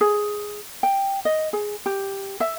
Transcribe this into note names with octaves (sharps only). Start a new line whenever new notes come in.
G#4
G5
D#5
G#4
G4
E5